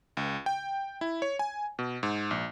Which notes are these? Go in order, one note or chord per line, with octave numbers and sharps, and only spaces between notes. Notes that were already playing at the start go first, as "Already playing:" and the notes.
C#2
G5
E4
C#5
G#5
B2
G#2
A#1